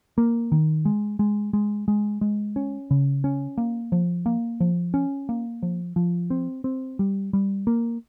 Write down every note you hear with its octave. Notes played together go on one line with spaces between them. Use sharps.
A#3
D#3
G#3
G#3
G#3
G#3
G#3
C#4
C#3
C#4
A#3
F3
A#3
F3
C#4
A#3
F3
F3
C4
C4
G3
G3
A#3